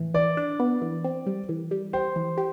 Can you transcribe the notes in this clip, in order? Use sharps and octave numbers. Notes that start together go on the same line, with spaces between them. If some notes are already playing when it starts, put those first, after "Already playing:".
Already playing: A2 E3
E3 D5
D4
B3
E3
C4
G3
E3
G3
G4 C5
E3
G4